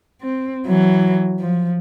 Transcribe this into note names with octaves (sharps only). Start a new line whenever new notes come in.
C4
E3 F#3
F3